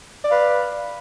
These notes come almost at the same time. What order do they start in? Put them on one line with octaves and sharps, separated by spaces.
D5 F5 B4